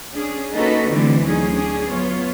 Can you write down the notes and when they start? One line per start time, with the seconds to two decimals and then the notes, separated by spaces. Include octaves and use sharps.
0.13 C#4 D4 G#4
0.54 A#3 C#4 D#4 F#4 A4 B4
0.89 D3 E3 G3 A3 C4 D4
1.22 D2 F#3 C#4 D#4 G#4
1.52 C#4 D4 G#4
1.89 F#3 B3 F4 C#5